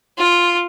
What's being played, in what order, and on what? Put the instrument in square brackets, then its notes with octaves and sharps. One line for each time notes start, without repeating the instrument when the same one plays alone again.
[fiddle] F4